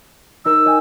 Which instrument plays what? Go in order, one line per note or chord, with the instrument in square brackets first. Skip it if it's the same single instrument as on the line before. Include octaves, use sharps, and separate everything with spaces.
[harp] D#4 A#4 [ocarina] E6
[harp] D#5 G5 G#5